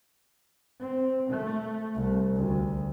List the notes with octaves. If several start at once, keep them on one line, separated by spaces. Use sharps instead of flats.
C4
A3
C2
D2